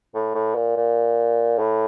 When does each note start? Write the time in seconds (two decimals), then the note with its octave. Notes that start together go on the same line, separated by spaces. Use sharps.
0.14 A2
0.34 A2
0.55 A#2
0.76 A#2
1.59 A2